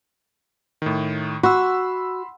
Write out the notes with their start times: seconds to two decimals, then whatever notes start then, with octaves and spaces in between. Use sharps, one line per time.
0.82 A2 D#3
1.43 F#4 B5 C6 E6